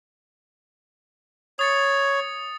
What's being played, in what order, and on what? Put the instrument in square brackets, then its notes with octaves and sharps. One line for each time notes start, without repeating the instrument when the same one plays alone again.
[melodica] C#5 [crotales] D#6 A6 C#7